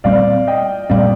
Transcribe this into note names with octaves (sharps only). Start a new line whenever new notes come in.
A#2 G3 C4 D5 F5
D#5 G5
A#2 G3 C4 D5 F5